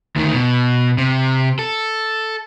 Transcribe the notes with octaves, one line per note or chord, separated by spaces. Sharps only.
D2 D#3
B2
C3
A4